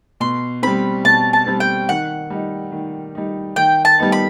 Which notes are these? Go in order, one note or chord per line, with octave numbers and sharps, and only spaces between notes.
B2 C6
G3 C4 B5
B2 A5
A5
G3 C4
G5
D#3 F#5
G3 D#4
D#3
G3 D#4
D#3 G5
A5
G3 B3 D#4
B5